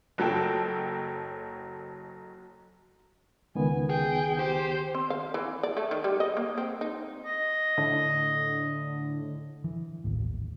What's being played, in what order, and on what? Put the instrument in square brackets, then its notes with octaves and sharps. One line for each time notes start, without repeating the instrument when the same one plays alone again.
[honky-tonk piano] F#1 F#3 A4 G5
[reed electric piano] C#2 D#3 B3 [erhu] G#5
[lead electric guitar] G#4 [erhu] G5
[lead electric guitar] G4 [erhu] C5
[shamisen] C4
F5
E3
D5
A3
D#3
G3
D#5
A#3
C4
D#4
[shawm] D#5
[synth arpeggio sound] A2 D3
[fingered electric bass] E3
A1 D#2 A2